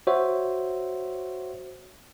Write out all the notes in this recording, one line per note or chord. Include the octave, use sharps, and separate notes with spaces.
F#4 C5 C#5 E5